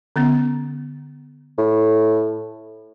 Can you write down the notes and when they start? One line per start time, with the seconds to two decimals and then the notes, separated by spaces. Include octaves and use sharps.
0.16 D3 B3 C#4
1.58 A2